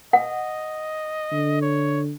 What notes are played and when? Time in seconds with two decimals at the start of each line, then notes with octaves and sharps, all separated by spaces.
0.13 D#5 F#5
1.32 D3
1.62 C#5